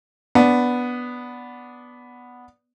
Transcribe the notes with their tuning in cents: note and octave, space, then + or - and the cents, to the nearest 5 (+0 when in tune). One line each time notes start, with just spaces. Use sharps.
B3 +0 D4 -10